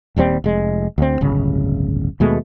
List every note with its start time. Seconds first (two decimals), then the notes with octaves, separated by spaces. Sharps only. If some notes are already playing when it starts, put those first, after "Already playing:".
0.16 D#1 D#2 G3 C4
0.44 F1 G#3
0.98 D2 C4
1.21 D1 G1 C#3
2.20 D#2 B2 G#3 A3